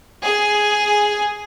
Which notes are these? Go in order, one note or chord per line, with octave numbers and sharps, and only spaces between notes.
G#4